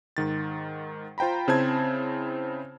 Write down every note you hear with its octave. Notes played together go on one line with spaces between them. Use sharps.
G#2 D#3 A6
F4 C5 G5 A#5 B5
C#3 C4 E4 C5 A5 G#6